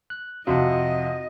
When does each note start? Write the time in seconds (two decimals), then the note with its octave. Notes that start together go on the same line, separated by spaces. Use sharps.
0.10 F#6
0.47 F2 C3 F#4 D#5 F5 F#5